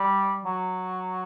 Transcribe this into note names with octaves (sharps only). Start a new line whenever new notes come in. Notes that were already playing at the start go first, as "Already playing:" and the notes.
Already playing: G3
F#3